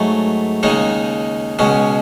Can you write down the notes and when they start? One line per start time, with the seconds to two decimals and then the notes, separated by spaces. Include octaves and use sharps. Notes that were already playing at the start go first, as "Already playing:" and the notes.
Already playing: G#2 F#3 A3
0.63 D#2 C#3 G#3 D#4
1.59 C#2 B2 G#3 C#4